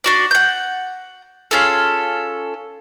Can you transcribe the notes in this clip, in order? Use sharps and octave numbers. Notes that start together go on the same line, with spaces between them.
D4 F#4 D5
F#5 G6
C#4 F4 G#4 A4